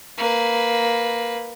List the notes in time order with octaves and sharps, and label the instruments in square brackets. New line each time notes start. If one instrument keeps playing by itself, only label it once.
[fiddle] A#3 B4